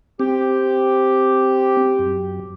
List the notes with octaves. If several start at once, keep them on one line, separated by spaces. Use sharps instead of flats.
C4 G4
F#2